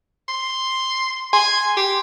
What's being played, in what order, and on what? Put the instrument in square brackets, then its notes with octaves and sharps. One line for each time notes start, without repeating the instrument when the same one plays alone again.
[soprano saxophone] C6
[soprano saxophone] G#5 [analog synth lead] C6
[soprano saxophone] G4